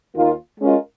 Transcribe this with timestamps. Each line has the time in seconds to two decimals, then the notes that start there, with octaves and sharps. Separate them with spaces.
0.15 D#2 D#3 A#3 F4
0.60 G#3 C#4 F4 A#4 D#5